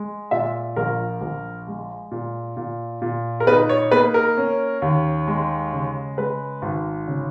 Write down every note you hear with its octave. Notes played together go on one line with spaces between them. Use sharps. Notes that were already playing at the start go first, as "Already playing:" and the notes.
Already playing: G#3
A#2 E5
A#1 A#4
A#1
G#3
A#2
A#2
A#2
A#4
D#4 B4
C#5
A#3 B4
A#4
C#4
D#2
G#3
C#3
G#3 B4
G#1
C#3